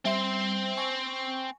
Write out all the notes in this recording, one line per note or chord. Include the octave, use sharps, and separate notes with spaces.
G3 C4 C5 E5
G#5 C#6